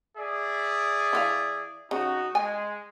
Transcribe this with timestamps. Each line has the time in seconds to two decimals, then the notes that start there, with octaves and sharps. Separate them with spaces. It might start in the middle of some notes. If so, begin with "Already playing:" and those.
0.18 G#4 D5 E5
1.13 E3 F#4 F5
1.91 C#3 D#4 F#4
2.35 G#3 G#5